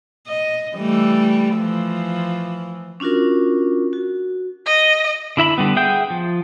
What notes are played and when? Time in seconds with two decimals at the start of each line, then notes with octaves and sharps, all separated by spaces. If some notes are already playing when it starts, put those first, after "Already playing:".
0.28 D#5
0.75 E3 G3 A3
1.55 E3 F3
3.00 C#4 D4 F4 F#4 A#4
3.93 F#4
4.66 D#5
5.37 D3 E4 E5 B5
5.58 D3 G3 B3
5.76 G#4 E5 F#5 G5 G6
6.10 F3